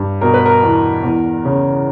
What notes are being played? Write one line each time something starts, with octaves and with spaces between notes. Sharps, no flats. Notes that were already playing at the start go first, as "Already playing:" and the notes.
Already playing: G2
B2 A#4
B4
A#4
E2
E2
C#3